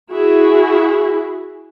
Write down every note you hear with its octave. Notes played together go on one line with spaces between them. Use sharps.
E4 F#4 G#4